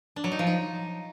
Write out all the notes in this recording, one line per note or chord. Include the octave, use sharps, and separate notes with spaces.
D4
F#3
D#4
F3
D#4